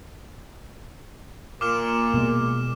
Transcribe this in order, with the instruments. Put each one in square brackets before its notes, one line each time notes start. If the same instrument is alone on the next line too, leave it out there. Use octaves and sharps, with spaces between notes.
[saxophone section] A#2 [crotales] D6 F6 E7
[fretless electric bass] B2 G#3